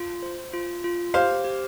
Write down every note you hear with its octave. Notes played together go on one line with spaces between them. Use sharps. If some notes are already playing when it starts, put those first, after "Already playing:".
Already playing: F4
C5
F4
F4
G4 C5 F5
G4